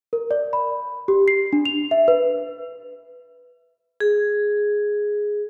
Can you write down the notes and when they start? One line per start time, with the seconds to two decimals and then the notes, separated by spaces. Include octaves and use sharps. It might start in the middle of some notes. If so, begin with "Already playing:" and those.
0.13 A#4
0.31 D5
0.53 B5
1.08 G4
1.28 C7
1.53 D4
1.65 F7
1.91 E5
2.08 B4
4.00 G#4